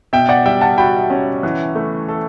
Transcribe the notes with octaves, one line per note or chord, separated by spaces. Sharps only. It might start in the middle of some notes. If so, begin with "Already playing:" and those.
B2 E5 G5
D5 F#5
G3 E5 G5
F#5 A5
F#4 G5 B5
C#4
E3
A3
A4